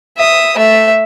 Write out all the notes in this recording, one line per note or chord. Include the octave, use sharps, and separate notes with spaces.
E5 D#6
A3 E5